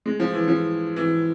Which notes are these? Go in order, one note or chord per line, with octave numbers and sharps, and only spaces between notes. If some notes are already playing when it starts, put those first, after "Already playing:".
G#3
F3
E3
F3
E3